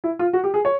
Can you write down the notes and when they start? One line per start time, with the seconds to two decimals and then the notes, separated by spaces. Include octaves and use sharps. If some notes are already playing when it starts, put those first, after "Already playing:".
0.04 E4
0.19 F4
0.33 F#4
0.44 G4
0.54 G#4
0.65 C#5